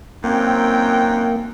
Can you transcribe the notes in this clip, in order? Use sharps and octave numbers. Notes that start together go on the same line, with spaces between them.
F#2 A#3 C4 D#4 G5